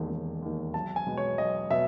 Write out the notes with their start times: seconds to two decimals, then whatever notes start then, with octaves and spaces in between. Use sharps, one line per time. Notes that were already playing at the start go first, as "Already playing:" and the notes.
Already playing: E1 D#2 D#3
0.10 E1
0.42 D#2 D#3
0.74 B1 A5
0.96 G#5
1.07 B2 G#3 B3
1.17 C#5
1.38 B1 D#5
1.70 B2 E5